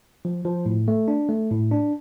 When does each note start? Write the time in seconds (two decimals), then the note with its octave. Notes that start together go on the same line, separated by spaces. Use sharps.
0.25 F3
0.45 F3
0.66 A2
0.88 A3
1.08 D4
1.29 A3
1.51 A2
1.71 D4